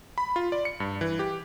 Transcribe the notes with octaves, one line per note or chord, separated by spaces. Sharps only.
B5
F4
D5
C#7
G2
E3
G4